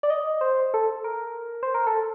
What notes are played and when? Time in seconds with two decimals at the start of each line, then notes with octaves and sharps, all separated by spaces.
0.03 D5
0.10 D#5
0.41 C5
0.74 A4
1.04 A#4
1.63 C5
1.74 A#4
1.87 A4